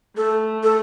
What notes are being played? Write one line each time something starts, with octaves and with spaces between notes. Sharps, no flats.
A3 A4
A4